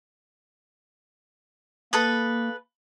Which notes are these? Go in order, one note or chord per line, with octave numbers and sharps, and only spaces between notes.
A#3 A4 B4 D#6